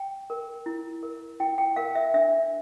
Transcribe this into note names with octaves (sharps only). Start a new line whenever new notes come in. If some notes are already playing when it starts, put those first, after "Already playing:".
Already playing: G5
A#4
E4
A#4
E4 G5
G5
A#4 F5
E5
D4 E5